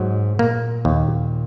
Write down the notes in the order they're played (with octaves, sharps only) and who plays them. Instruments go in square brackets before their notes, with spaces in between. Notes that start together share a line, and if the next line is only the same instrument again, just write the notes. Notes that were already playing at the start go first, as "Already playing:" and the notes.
Already playing: [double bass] G#2 [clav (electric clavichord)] F#3
[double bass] A#2 [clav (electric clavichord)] A#3
[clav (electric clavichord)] D#2